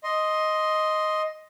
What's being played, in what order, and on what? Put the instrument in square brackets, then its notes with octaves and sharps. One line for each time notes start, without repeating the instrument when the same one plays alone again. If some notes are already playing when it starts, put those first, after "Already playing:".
[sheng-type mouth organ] D#5 C6